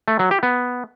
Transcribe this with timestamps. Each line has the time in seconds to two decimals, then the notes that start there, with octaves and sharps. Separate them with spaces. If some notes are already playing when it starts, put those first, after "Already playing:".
0.08 A3
0.19 F#3
0.31 G4
0.43 B3